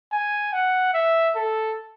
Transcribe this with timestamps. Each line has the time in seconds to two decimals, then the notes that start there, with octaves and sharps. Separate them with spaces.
0.13 G#5
0.53 F#5
0.94 E5
1.36 A4